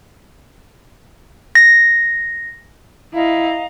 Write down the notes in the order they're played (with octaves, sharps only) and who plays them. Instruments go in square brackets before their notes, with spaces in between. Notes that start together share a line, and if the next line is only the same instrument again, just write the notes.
[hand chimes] A#6
[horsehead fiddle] E4 [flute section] D#5 F5 A#5